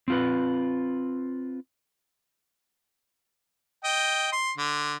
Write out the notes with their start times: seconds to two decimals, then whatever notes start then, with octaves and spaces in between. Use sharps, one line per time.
0.08 C4 F4 B4
3.84 D#5 G5
4.33 C6
4.58 D3